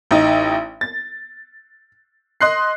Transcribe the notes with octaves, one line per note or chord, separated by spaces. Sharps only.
A1 D#4
A6
D#5 C6 F#6 C7